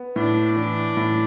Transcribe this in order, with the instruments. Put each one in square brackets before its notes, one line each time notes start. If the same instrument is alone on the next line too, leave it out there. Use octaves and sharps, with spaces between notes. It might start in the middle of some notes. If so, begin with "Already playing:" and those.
Already playing: [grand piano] B3
[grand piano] A2 [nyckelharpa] D4
[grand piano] E3 [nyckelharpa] D4
[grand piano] A2